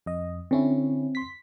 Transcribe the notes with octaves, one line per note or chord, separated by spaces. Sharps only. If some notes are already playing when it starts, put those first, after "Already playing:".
F2 D#5
D3 C4 C#4 E4
C6 B6